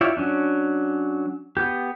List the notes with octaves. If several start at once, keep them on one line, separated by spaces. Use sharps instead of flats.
E4 F4 G4 C#5 D5
F#3 C#4 D4
B3 G4